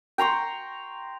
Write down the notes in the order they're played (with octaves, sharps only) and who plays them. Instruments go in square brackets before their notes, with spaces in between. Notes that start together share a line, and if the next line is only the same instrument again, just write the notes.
[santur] G5 A#5 C6 C#6